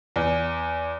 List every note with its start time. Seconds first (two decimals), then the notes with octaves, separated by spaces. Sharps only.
0.16 E2